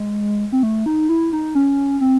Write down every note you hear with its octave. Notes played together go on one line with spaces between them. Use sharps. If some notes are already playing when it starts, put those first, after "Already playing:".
Already playing: G#3
C4
A3
D#4
E4
D#4
C#4
C4